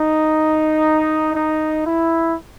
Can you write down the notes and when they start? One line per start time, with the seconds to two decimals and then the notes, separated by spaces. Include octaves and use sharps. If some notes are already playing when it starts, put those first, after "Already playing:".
Already playing: D#4
1.33 D#4
1.86 E4